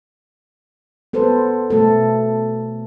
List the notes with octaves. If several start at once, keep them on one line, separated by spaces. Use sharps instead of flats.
B3 A4 B4 C5
B2 A3 A4